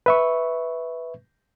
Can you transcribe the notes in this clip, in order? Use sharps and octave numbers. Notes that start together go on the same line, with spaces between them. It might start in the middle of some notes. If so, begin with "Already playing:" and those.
B4 E5 C#6